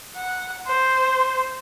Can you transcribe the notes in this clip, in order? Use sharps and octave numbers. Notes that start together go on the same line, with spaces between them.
F#5
C5